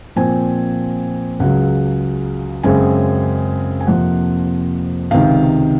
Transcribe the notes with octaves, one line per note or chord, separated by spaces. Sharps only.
A#2 F3 C4 G#5
C#2 C#3 F#3 F#5
F#2 C#3 G#3 C4 G#5
G#5
F2 C3 F3 A#3 F#5
C#2 C3 D#3 F5